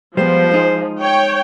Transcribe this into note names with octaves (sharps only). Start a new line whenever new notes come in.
F3 G3 G#3 B3 C5
G#3 D#4 G#4
C#5 G5